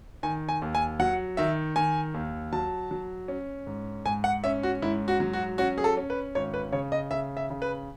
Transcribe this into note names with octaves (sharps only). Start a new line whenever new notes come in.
D#3 G#5
G#5
D#2
G#5
F#3 F#5
D#3 E5
D#3 G#5
D#2
F#3 A5
F#3
C#4
G#2
G#2 G#5
F#5
C#4 E5
F#4
G#2 E4
F#4
F#3
F#4
C#4 F#4
G#4
A4
C#4
B4
G#1 C#5
B4
C#3 C#5
D#5
C#3 E5
E5
C#3
B4